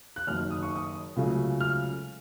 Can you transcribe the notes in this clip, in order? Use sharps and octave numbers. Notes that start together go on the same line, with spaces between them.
F#6
F#1 F#2 D#3 F6
D#6
C#6
D#6
C#2 C#3 F#3 A3
F6